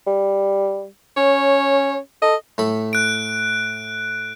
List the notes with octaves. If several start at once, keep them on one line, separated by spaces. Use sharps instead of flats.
G3
C#4 C#5
A4 D#5
A2 A3 B5
F#6 D7